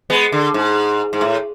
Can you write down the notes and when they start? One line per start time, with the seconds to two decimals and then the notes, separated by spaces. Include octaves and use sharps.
0.10 G#3 B3
0.32 D3
0.54 G#2
1.13 G#2
1.21 A2